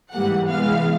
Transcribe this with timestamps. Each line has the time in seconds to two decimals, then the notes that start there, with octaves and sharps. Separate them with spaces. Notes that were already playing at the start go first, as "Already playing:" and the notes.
0.12 G#2 E3 G3 A#3 F#5
0.48 C3 E3 G#3 B3 F5